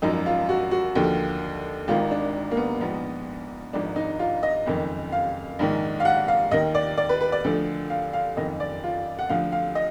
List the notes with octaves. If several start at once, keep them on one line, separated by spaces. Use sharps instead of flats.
G#1 F#2 F3 D#4
F4
F#4
F#4
D#2 D3 F3
G#1 G#2 D#3 F4
D4
A#3
B3
A#1 G#2 F3 B3
G#1 G#2 F3 D4
D#4
F4
D#5
F#1 F2 D#3
F5
A#1 G#2 D#3
F5
F#5
F5
D#2 D#3 D#5
D5
D5
B4
B4
D5
D2 D3 F3
F5
F5
F#1 F2 D#3 D#5
D5
F4
F#5
D2 D3 F3 F5
F5
D#5